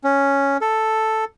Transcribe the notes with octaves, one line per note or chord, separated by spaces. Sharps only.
C#4
A4